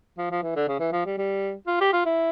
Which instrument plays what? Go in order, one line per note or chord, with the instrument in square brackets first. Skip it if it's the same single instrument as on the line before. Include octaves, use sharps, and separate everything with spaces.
[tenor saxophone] F3
F3
E3
D3
C#3
E3
F3
G3
G3
F4
G4
F4
E4